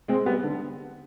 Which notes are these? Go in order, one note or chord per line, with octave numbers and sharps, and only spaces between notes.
G#3 C4
G3 B3
D3